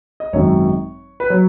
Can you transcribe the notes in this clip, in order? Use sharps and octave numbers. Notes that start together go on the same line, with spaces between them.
D#5
G#1 F#2 D#3 F#3 C#5
B4
F#3 C#5